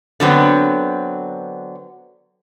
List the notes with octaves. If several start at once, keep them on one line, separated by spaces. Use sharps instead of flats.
D3 F#3 B3 C4